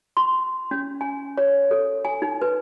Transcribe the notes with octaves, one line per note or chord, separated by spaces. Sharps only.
C6
C#4
G#5
C#5
A4
G#5
D#4
B4